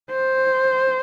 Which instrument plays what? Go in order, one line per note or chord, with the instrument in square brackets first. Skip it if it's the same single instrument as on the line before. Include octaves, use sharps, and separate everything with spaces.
[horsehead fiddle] C5